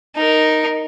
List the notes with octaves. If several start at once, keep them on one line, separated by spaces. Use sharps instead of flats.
D#4 A#4